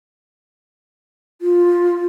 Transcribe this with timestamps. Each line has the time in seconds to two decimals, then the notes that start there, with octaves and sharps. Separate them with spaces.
1.41 F4